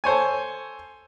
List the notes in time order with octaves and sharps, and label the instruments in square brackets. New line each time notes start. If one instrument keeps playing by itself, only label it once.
[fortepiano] A4 C5 C#5 G#5